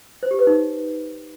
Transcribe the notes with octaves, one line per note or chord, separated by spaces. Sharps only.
C5
G4
B4
D#4